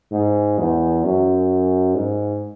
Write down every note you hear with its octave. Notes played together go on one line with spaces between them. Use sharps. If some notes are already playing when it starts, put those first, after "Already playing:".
G#2
E2
F#2
G#2